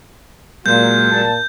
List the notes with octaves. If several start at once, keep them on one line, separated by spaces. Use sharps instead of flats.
A#2 F#3 G#3 F4 G6
A#2 A5